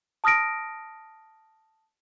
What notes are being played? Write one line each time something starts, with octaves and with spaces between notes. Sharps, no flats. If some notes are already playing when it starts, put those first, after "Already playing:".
A5 D#6 F6 A#6 D7